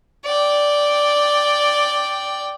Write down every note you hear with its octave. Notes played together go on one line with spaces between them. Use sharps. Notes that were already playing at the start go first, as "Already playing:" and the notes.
D5 G5